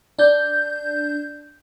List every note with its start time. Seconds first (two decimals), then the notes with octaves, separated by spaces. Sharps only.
0.19 D4 G6